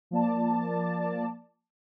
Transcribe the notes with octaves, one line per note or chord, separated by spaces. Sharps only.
F3 A#3 D5 A5